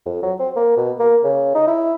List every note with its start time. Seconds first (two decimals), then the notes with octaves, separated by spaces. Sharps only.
0.06 F2
0.23 F#3
0.39 C4
0.56 A#3
0.77 B2
1.00 A#3
1.24 C#3
1.55 D#4
1.67 E4